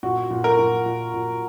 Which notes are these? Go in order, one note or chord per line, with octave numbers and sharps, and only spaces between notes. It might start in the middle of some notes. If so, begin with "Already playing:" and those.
A#2 F#4
A#2
A#4
A#2
A#2
A#2